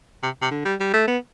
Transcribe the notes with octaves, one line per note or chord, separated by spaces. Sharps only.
C3
C3
D3
G3
G3
A3
B3